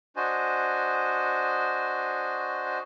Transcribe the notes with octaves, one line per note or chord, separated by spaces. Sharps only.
D4 F#4 C5 D#5 G#5